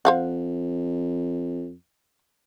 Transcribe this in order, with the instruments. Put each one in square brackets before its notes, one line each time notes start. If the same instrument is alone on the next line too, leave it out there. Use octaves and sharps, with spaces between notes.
[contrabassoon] F2 [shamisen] C5 F5 F#5